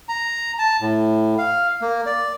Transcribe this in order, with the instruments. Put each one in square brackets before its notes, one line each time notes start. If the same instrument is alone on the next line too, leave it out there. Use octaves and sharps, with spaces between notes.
[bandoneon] A#5
A5
A2
F5
A#3
D5